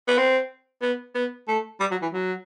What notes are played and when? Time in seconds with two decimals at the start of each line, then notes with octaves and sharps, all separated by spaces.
0.08 B3
0.18 C4
0.82 B3
1.15 B3
1.48 A3
1.80 G3
1.91 F#3
2.02 E3
2.13 F#3